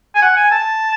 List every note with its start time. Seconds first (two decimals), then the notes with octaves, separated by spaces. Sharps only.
0.15 G#5
0.22 F#5
0.36 G#5
0.51 A5